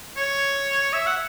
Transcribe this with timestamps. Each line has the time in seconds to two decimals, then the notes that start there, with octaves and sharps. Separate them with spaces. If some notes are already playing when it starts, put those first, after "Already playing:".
0.17 C#5
0.93 E5
1.06 F#5